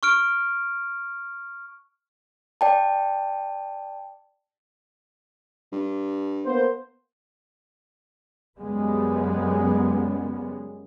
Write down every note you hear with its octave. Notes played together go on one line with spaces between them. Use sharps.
C#6 F6 D7
D5 G5 A5
G2
A#3 B3 C5
F#2 C#3 G3 G#3 B3